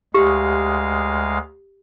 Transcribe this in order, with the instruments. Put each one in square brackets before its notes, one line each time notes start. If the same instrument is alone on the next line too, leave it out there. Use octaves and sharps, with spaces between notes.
[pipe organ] D2 G#3 F5 [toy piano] G4